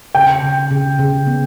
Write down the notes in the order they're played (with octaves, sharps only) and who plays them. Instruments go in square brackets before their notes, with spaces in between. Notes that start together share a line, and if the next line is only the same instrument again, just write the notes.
[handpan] C#3 [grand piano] G5
[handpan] C#3
C#3
C#3
B3